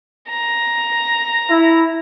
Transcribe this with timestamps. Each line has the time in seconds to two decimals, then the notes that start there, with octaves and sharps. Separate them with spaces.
0.30 A#5
1.49 E4